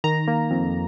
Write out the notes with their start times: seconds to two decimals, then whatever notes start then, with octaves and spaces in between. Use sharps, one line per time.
0.04 D#3 A#5
0.28 A#3
0.51 F2